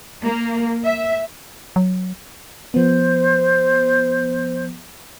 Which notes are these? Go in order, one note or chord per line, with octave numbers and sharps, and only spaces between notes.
A#3
E5
F#3
F3 B3 C5